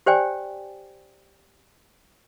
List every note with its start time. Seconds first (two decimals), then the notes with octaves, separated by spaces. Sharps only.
0.06 G4 C5 D5 G5 G#5